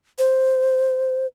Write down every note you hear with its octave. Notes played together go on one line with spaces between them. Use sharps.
C5